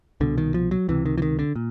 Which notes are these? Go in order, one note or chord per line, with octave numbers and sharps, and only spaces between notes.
C2 B2 D3
D#3
F3
F#3
C#2 C3 E3
D#3
E3
D#3
D3
A#2